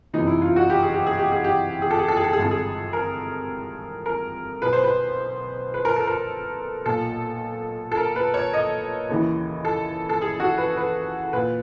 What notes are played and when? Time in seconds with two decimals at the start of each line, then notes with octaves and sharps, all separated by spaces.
0.13 F#1 E2 C3 E3 D#4
0.27 E4
0.42 F4
0.56 F#4
0.70 G4
0.83 G#4
0.94 G4
1.06 G#4
1.19 G4
1.32 G#4
1.44 G4
1.82 G#4
1.90 A4
1.99 G#4
2.08 A4
2.17 G#4
2.24 A4
2.33 G#4
2.38 G#1 G2 D3 A4
2.51 G#4
2.93 A#4
4.06 A#4
4.62 B1 B2 B4
4.73 C5
4.84 B4
5.74 B4
5.85 A#4
5.96 A4
6.07 A#4
6.85 B1 A#2 A4
7.91 A4
7.97 A#4
8.16 B4
8.34 C#5
8.53 D#5
9.09 D#2 C#3 E3
9.65 A4
10.09 A4
10.21 G#4
10.40 F#4
10.58 B4
10.77 B4
11.33 A#2 B4